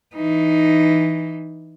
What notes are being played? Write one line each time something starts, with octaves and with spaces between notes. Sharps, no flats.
E3 D#4